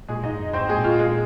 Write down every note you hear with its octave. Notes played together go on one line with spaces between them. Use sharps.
A#2 G#3 G#4
G#2 D#4 D#5
F2
G#2 C4 C5
G#3 G#4
A#2
F4
G#3 G#4